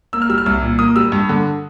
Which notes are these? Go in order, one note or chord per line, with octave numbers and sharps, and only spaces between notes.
A#3 E6
F6
G3 E6
F6
C2 E6
A#2
A#3 D#6
G3 E6
G2
D3